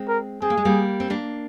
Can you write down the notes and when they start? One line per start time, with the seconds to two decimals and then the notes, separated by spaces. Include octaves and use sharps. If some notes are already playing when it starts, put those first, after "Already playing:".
Already playing: G#3 C4
0.08 A#4
0.42 C4 G#4
0.50 A#3
0.57 G#3
0.65 G3 A#3
1.00 C4
1.10 A#3 D4